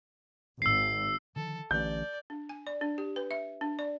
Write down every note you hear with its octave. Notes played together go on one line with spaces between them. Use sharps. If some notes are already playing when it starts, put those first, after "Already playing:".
G#1 E6 C7
D3 D#3 F3 A4
A1 D3 A3 D5 G6
D4
G#5
D5
D4
G4
B4
E5
D4
D5